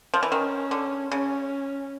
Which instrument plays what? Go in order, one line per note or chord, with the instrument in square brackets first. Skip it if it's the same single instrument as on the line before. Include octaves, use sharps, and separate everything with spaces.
[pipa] F3
E3
[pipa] D#3 [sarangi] C#4
[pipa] D3
[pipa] C#3 [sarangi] C#4